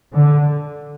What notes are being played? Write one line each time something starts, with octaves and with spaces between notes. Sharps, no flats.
D3